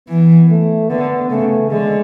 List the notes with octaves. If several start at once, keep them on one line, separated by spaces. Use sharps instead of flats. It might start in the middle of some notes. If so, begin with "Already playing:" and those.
E3 B3
A3
D3 B3
C#3 A3
D3 G#3